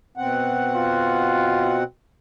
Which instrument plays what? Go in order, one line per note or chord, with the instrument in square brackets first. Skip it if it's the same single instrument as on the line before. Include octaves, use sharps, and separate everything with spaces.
[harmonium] B2 C4 F#5
[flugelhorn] F4